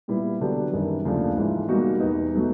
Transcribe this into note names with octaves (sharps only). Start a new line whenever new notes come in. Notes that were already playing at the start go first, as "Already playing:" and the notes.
A#2 G3 B3 E4
D3 F#3 B3 D4 G4
F#2 D#3 G3
D#2 C#3 F3 A3 D4
G#2 E3 G#3
B2 G3 A#3 D#4 F#4
E2 B2 G3 B3 D#4
B2 F#3 A3